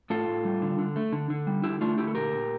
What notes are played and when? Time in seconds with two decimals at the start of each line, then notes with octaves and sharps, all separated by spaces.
0.10 A2 F4 A4
0.28 A2
0.45 G3
0.62 D3
0.79 D3
0.96 A3
1.12 D3
1.30 D3
1.47 G3
1.64 D3 E4 G4
1.81 A3 D4 F4
1.98 D3 E4 G4
2.07 A4
2.15 A#2 G4 A#4
2.32 A#2